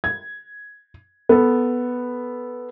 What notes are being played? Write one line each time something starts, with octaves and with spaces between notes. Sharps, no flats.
G#6
B3 A4